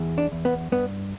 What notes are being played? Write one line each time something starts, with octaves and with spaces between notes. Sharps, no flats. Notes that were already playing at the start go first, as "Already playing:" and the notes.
Already playing: E2
D4
E2
B3
G2 B3